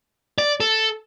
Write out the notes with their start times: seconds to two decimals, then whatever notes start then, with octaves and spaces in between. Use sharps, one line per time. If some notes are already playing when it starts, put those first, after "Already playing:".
0.38 D5
0.60 A4